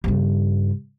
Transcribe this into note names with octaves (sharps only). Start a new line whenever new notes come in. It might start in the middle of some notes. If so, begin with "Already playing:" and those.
G2 C#3